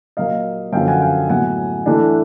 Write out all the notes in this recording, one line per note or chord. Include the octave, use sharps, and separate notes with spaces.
A#2 F#3 A#3 D#5 F5
F#2 D3 F3 A#3 C#4 F5 G5
F#5 G#5
F5 G5
A2 F#3 B3 F#5 G#5
E3 A3 D4